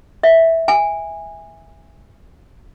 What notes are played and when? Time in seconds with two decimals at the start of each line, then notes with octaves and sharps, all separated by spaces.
0.23 E5
0.68 G#5